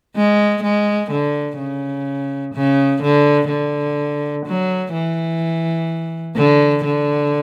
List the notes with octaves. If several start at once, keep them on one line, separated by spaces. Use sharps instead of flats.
G#3
G#3
D3
C#3
C#3
D3
D3
F#3
E3
D3
D3